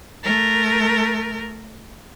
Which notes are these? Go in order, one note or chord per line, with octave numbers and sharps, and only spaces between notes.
A3 A#4